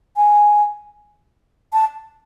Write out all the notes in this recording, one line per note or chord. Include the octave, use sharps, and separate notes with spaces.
G#5
A5